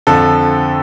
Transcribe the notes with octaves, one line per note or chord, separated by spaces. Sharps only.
F2 D3 F3 A4